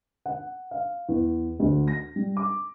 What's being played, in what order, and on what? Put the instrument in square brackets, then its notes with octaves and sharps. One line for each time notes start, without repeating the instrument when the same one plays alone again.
[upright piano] F#5
F5
E2
D2
A#6
G3
D6